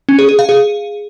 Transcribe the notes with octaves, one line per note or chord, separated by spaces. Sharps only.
C#4
G#4
G#4
F5
G#4